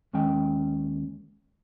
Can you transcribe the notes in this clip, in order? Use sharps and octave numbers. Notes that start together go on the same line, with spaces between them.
D#2 G#3 C#4 G5